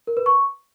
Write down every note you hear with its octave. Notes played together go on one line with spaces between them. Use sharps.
A#4
B4
C#6